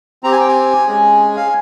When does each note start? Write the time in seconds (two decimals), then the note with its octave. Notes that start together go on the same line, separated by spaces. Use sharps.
0.23 C4 G4 A#5
0.32 G#5
0.40 G5
0.48 G#5
0.87 G#3 C#4 G#4
1.36 F5